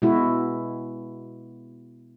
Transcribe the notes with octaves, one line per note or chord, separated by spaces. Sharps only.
B2 G#3 E4 F#4